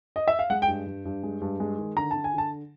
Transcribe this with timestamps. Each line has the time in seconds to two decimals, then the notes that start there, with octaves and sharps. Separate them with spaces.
0.16 D#5
0.28 E5
0.39 F5
0.50 G#3 F#5
0.62 G5
0.68 G2
0.86 G2
1.05 G2
1.23 G#3
1.41 G2
1.60 G#3
1.78 D#3
1.96 D3 A#5
2.11 D3 A5
2.24 G#5
2.34 D3 A5